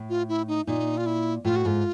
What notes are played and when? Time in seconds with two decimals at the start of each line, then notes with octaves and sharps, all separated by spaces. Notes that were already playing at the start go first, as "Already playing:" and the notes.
Already playing: A2
0.09 F4
0.29 E4
0.48 D#4
0.67 A#2 D#4
0.97 F4
1.06 E4
1.45 A2 F4
1.56 F#4
1.65 G#2 F4